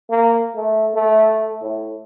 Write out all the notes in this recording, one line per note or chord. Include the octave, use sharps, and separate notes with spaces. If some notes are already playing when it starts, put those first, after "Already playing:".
A#3
A3
A3
A2